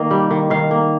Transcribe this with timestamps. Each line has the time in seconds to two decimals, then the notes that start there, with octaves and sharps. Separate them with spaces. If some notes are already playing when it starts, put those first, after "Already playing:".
Already playing: D#3 A#3 D#5
0.11 G3
0.31 D#3
0.50 D#3 F5
0.71 A#3